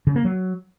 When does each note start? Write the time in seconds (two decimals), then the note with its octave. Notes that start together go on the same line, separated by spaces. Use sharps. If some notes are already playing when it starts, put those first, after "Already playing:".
0.07 C#3
0.16 A#3
0.24 F#3